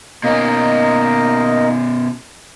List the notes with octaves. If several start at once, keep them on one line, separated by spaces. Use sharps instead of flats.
B2 A#3 C#4 D#4 D#5